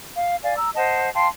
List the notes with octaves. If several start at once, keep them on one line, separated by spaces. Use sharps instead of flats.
F5
D5 F5 G#5
A#5 E6
C5 D#5 F#5 A5
F5 G5 A5 C6